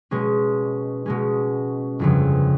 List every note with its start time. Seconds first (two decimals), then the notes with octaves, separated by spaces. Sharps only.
0.11 B2 G#3 C#4
1.06 B2 G#3 C#4
1.99 G1 F2 C#3